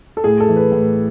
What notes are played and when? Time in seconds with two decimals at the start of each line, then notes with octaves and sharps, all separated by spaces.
0.17 A4
0.24 A2 G#4
0.40 A4
0.49 E3
0.56 B4
0.72 A2